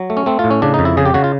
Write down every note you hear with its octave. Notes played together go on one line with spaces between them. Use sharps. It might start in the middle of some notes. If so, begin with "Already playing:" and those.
Already playing: F#3
A3
C#4
A3 C4
F4
A2
C#4
C#3 D4
D#4
F2
E4
C#3 G#4
G4
C#3 F#4
F4